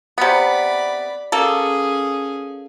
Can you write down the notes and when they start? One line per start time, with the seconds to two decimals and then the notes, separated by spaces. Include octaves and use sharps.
0.18 C3 B3 D5 B5
1.32 A#3 C#4 G#4 A4